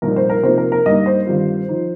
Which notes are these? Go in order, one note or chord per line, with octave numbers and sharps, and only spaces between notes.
C2 A#2 F3 D#4 A#4
C5
A#4
C3 F3 A#3 D#4 C5
A#4
A#4
G2 G3 A#3 D#4 D#5
C5
G2 D#3 G3 C4 F4
F3 D#4